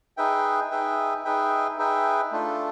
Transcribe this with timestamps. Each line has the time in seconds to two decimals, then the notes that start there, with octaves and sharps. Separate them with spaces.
0.17 D#4 G#4 B4 E5 G5
0.71 D#4 G#4 B4 E5 G5
1.25 D#4 G#4 B4 E5 G5
1.78 D#4 G#4 B4 E5 G5
2.32 A3 D4 F4 A4